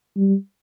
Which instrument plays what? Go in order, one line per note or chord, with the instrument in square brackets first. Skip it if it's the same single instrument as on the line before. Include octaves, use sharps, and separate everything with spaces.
[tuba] G3